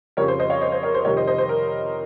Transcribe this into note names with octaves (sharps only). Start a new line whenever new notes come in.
F2 C#3 G3 A#4 C#5
C5
C5 D#5
C#5 F5
C5 D#5
C5
A#4 C#5
C5
F2 C3 D#3 G3 A#4 C#5
C5 D#5
C5 D#5
C5
A#4